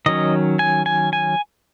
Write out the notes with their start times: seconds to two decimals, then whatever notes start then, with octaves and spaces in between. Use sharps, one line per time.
0.06 D#3 F#3 C#4 D#5
0.59 G#5
0.86 G#5
1.13 G#5